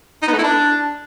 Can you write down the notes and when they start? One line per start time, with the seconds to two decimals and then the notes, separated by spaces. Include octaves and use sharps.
0.22 D#4
0.28 B3
0.33 A3
0.38 E4
0.44 D4